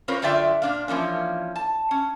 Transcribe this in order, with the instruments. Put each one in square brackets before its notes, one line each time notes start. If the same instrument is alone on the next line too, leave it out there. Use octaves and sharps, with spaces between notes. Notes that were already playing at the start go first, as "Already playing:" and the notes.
[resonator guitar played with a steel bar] C4 C#4 F4 A#4 B4 C#5
F#2 D3 F4 D5 E5 G5
A#2 D4 F5
E3 F3 A#3 C#4
A5
C#4